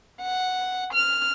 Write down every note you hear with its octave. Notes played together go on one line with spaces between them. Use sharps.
F#5
F6